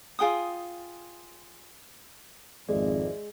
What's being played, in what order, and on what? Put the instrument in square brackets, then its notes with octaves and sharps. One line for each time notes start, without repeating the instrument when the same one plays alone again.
[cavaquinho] F4 G#4 G5 D#6
[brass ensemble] G#1 F2 [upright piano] G#3 [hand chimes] D5 E5